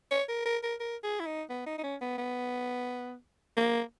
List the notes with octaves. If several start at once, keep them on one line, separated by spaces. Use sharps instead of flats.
C#5
A#4
A#4
A#4
A#4
G#4
E4
D#4
B3
D#4
D#4
C#4
B3
B3
A#3